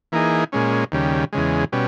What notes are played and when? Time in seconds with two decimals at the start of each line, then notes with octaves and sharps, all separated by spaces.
0.12 E3 A#3 D#4 G#4
0.52 A#2 G#3 C#4
0.92 D#2 C#3 G3
1.33 E2 C#3 G#3
1.72 B2 G3 C#4